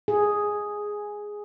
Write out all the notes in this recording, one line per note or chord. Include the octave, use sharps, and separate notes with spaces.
G#4